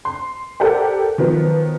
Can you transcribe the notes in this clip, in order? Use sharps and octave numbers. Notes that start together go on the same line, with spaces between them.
C6
G4 A4 A#4 C5 D5 F#5
D#3 F3 F#3 B3